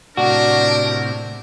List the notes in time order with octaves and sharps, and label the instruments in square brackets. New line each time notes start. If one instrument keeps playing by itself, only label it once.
[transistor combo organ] A2 C3 [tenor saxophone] D4 [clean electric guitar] F#4 [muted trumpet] A#4